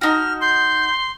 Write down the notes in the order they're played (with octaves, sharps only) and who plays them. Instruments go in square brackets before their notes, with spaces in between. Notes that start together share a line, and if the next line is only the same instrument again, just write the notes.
[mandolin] D#4 F#4 [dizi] F6
[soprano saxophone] C6 [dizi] G6